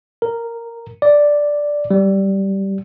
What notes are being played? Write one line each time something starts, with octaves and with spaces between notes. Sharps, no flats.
A#4
D5
G3